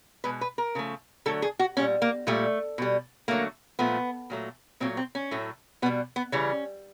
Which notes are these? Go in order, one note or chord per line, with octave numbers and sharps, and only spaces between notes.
B2 G#3 B4
B4
A#4
C#3 F3 A3
D3 F#3 A3 A4
G#4
F#4
A#2 G3 C#4
A#3
A#2 G3 A3
B2 G3
D3 F#3 A3 A#3
A#2 F3 A3 B3
A#2 F#3 A3
A#2 F#3 A3 C4
C4
C#4
A2 F#3 A3
B2 G3 B3
B3
C#3 E3 G3 C#4